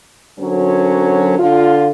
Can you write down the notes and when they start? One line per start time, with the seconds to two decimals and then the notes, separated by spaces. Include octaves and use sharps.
0.38 F#2 D3 F#3 C4 C#4
1.38 D3 F4